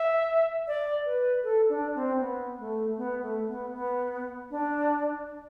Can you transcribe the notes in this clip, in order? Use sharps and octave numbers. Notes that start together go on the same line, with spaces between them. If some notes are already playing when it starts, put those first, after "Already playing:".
Already playing: E5
D5
B4
A4
D4
C4
B3
A3
B3
A3
B3
B3
D4